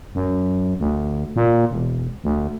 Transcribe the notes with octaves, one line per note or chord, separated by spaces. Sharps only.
F#2
D2
A#2
E1
D2